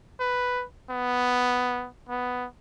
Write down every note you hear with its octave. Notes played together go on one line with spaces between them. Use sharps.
B4
B3
B3